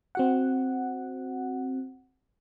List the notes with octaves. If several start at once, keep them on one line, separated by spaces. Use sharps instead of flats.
C4 F#4 F#5